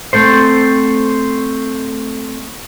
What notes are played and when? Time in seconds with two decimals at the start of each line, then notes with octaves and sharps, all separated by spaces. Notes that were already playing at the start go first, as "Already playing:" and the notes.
0.13 A3 C4 A4 C5